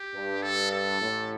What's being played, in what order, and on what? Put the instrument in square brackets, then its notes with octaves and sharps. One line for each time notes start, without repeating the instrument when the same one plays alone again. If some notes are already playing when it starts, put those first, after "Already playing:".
Already playing: [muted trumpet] G4
[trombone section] G2
[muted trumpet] A4
A4
[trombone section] A1 A2